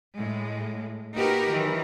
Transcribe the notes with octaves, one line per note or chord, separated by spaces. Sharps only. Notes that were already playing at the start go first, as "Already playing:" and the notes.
A2 G#3
A#3 D#4 F#4 G4 A#4 B4
D#3 E3 F#3